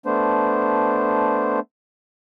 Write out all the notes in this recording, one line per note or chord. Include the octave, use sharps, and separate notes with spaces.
A3 B3 D4 C5